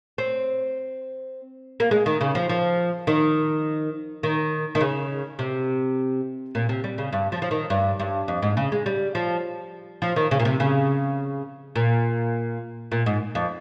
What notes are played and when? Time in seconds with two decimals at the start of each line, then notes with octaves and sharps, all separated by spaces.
0.18 C4
1.80 A#3
1.91 G#3
2.06 D#3
2.21 C#3
2.35 F3
2.49 F3
3.07 D#3
4.23 D#3
4.75 D#3
4.81 C#3
5.39 C3
6.55 A#2
6.69 C3
6.84 G3
6.98 C#3
7.13 G2
7.32 F3
7.42 F3
7.51 D#3
7.70 G2
7.99 G2
8.28 F2
8.42 G#2
8.57 C#3
8.72 G#3
8.86 G3
9.15 F3
10.02 F3
10.16 D#3
10.31 C#3
10.40 A#2
10.45 C3
10.60 C#3
11.76 A#2
12.92 A#2
13.06 G#2
13.35 F2